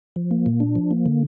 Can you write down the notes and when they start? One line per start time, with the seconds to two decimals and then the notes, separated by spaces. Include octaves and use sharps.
0.16 F3
0.31 A#3
0.46 A#2
0.60 D4
0.75 F3
0.91 A#3
1.06 D3